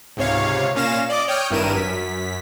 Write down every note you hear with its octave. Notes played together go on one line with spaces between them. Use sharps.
C#2 G#2 C3 C#5 F5
A#2 C#4 F5 A#6 E7
D5 D#5 D6
C#5 G5 D#6 F6 G6
G#1 G2 E4 A#4 D#7 E7
F#2 B6